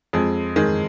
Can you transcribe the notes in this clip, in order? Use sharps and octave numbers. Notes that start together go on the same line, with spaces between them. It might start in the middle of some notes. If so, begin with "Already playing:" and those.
F2 G#3
D#3 G#3